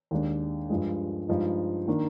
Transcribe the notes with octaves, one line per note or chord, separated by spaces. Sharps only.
D#2 D#3 G#3 D4
G2 F3 G#3
G2 F3 G#3 D#4
D#3 A#3 D4